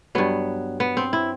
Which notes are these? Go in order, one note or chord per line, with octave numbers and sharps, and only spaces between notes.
G2 F#3 B3
B3
C4
E4